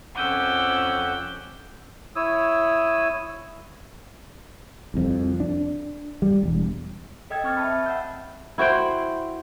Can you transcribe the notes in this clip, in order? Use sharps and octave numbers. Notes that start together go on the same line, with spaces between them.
F2 C#4 F#5 D6 E6 G6
E4 C#5 D#6 E6
C2 F2
D4
G3
E1
A4 D#5 G5 E6 G#6
C4 C#6 F6 G#6 A6
E5 A5 B5
E5 A5
F#5 E6 G6
E4 F#4 C5 G5